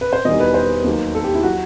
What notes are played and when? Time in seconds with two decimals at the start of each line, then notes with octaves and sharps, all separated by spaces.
0.01 B4
0.13 C5
0.25 E1 E2 D#3 G3 D#5
0.40 B4
0.54 C5
0.84 D#2 D#3 F#3
1.15 A4
1.24 G4
1.34 E4
1.43 F#3 F#4